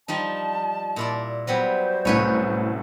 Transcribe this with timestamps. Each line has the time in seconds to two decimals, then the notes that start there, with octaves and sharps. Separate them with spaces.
0.08 F3 G3 D#4 A5
0.96 A#2 E4 D5
1.47 F#3 G3 B3 C5
2.05 C2 A2 C#4 B4 C#5